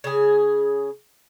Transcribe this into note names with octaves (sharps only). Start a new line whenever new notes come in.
C#3 G#4